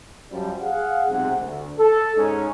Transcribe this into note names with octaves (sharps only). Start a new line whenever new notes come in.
F#2 F3 G3
G#4 F5 F#5
B1 C3 G#3 C4 F#5
D2
A4
G#2 C#4 D#4